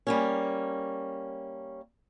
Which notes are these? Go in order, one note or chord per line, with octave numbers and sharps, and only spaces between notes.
G3 A#3 C#4